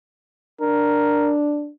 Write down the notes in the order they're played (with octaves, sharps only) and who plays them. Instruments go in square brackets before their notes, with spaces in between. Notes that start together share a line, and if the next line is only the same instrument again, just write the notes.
[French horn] D4 [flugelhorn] A#4